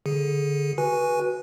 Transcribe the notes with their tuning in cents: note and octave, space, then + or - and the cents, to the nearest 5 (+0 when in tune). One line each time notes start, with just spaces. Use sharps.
D3 -10 G#4 +0
F#4 +0 B4 -20 G#5 +0